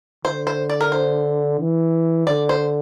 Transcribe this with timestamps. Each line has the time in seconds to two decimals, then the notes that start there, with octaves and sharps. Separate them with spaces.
0.25 D3 C5
0.47 C5
0.70 D5
0.81 A#4
0.92 C5
1.59 E3
2.27 D3 D5
2.49 C5